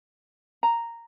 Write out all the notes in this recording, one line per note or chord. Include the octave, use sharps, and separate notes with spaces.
A#5